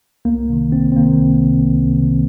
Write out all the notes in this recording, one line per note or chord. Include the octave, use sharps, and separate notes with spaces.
C2 A#3
C3 D#3
C2 C4
C4
C3 D#3 A#3
C2
C3 D#3
C2
C3 D#3